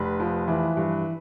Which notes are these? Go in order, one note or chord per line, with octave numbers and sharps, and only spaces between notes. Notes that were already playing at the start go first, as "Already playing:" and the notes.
Already playing: F1 B4
F3
E3
G2